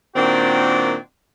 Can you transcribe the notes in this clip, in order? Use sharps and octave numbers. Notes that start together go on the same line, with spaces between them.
A#2 D#3 C4 D4 F#4